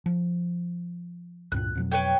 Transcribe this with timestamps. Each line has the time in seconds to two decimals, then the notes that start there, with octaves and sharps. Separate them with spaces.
0.06 F3
1.52 C#2 G2 A#2 F#6
1.75 F2 B2 F#3
1.92 B4 C#5 G5